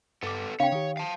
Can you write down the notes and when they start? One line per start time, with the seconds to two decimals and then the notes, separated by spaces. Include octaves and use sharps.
0.23 G2 B3 A4 D6
0.60 C#3 C4 D4 C#5 F5 G5
0.72 D#3 G4
0.97 F5 A5